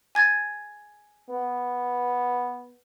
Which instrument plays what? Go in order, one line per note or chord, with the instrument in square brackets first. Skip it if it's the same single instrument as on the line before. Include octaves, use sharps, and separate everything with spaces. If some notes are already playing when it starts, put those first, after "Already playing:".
[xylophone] G#5 G#6 A6
[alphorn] B3